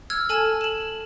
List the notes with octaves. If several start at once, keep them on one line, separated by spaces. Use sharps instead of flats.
E6 F6 G#6
A4 G#5 A5 F6
E7 F#7